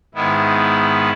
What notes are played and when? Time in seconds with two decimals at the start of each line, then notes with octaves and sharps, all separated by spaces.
0.15 G#2 D#3 B3 E4